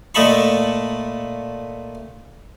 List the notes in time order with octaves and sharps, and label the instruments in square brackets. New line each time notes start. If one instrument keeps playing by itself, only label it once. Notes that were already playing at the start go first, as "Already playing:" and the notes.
[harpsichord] A#2 A3 D#5 A5 B5 C#6